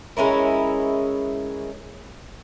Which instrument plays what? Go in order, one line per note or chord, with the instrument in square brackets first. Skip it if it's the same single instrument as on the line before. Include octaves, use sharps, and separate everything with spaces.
[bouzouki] G#3 C#4 E4 A#4